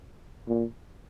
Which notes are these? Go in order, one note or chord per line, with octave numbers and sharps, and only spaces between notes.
A#2